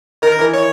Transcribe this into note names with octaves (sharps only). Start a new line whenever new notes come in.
D#3 A#4
E3
C#5